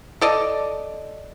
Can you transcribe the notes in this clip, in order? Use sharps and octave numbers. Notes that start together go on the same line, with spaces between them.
A4 D5 D#5